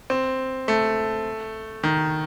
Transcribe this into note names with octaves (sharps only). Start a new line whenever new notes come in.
C4
A3
D#3